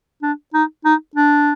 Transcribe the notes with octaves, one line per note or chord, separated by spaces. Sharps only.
D4
D#4
D#4
D4